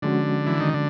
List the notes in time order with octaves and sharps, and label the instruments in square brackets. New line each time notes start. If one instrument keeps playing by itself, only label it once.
[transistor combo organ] D3 [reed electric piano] F3 G#3 C#4 F#4
[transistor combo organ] E3
D#3
D3